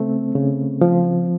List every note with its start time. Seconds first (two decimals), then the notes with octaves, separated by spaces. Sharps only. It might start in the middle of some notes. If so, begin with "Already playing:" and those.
Already playing: C#3 A3 C4
0.35 C#3
0.81 F3